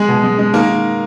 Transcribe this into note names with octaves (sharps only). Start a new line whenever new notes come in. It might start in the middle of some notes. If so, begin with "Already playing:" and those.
Already playing: G#3 G#4
B2
G#3
G#3
D#3 A#3 A#4
D#3